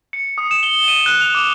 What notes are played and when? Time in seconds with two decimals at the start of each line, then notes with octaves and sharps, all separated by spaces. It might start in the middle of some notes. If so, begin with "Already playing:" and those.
0.13 C#7
0.38 D#6
0.51 E7
0.63 G7
0.88 D#7
1.06 F#6
1.21 F7
1.35 D6